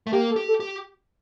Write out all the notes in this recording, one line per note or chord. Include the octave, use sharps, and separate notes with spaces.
A3
A#3 G4
A4
G4
A4
G4